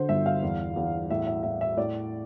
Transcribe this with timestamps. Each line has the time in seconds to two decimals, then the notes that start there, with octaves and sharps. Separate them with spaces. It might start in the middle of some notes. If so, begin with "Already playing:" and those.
Already playing: D3 C5
0.09 G1 E5
0.26 F5
0.42 E2
0.76 E2
1.10 A2 E5
1.27 E5
1.43 A2 E5
1.61 E5
1.77 A2 D5